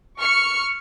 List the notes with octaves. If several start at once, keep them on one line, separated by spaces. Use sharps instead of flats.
C#6 F6 C#7